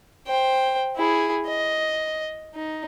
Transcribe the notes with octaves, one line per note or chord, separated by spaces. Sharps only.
C5 G5
E4 G#4
D#5
D#4